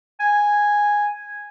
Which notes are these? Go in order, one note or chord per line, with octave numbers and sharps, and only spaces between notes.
G#5